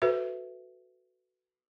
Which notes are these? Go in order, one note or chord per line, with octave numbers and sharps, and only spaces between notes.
F#4 A4 B4 C5 E5